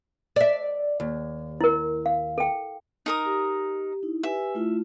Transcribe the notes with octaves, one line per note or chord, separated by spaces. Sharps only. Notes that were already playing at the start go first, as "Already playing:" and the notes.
D5 E5
D#2
E4 A#4
F5
A4 G5
D#4 A#4 D#6
G4
D#4 E4
G4 B4 E5 G#5
A3 E4 F4